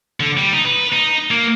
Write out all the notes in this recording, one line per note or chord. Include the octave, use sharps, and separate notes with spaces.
D3
G3
D#4
B4
D#4
A#3